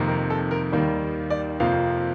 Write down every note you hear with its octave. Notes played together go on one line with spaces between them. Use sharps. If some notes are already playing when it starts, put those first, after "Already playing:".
Already playing: F2 C3 D#3 A#3
A#4
A4
A#4
D#2 D#3 G3 A#3
D5
F2 C3 F3 A#3 F5